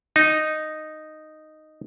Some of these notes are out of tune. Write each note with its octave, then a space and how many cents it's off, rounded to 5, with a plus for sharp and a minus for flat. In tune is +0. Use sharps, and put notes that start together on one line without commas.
D#4 -5